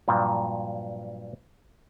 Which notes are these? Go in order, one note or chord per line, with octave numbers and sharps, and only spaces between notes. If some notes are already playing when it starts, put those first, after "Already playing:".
G2 A#2 F3 F#3